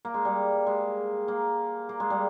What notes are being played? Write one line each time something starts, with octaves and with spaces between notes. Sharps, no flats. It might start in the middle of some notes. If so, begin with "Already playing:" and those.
A#3
G#3
G3
G#3
A#3
A#3
G#3
G3